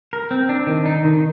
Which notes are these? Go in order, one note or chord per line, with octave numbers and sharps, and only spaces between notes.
A#4
C4
D4
D#3
D#4
D#3